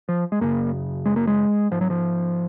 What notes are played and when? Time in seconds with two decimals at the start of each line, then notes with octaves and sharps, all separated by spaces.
0.09 F3
0.32 G#3
0.41 F#2 C#3 A#3
1.06 G#3
1.16 A#3
1.27 G#3
1.71 G#2 F3
1.81 F#3
1.90 F3